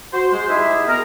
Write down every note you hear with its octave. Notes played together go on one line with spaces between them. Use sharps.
F#4 C5
G#3 C5
D#4 E4 G4 G#4 E5
G#3 B3 G#4 A#4